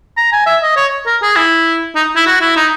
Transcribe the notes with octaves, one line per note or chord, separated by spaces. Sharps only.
A#5
G#5
E5
D#5
C#5
A#4
G#4
E4
D#4
E4
F#4
E4
D#4